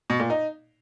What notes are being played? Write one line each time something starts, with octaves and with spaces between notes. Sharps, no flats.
B2
A#2
D#4